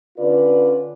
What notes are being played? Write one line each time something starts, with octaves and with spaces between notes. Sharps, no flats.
D3 C#4 F4 B4 D5